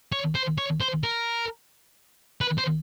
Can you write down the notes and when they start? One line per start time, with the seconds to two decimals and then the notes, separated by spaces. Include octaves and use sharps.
0.12 C#5
0.35 C5
0.58 C#5
0.80 C5
1.03 A#4
2.41 B4
2.58 C5